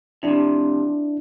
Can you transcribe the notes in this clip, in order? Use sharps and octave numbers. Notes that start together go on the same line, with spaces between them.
F2 C3 D4 E4